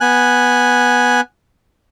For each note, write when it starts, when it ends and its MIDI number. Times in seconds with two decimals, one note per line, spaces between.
0.01 1.21 59
0.01 1.21 80
0.01 1.21 90